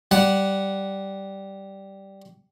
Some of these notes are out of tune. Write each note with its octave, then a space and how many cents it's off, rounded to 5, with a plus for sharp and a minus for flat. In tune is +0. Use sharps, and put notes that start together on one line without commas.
G3 -10 F#5 +0